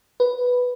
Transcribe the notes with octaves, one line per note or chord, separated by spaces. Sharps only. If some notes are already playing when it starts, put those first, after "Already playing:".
B4